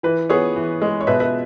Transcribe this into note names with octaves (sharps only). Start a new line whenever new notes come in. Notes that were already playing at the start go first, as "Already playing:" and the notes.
E3 B4
B3 G#4 C#5
E3
G#3
C#5
B2 B4 E5
B4 E5